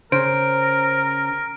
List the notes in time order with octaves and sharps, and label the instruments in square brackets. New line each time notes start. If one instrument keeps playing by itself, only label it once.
[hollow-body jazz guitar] C#3 [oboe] A#4 [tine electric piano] C5 [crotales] D7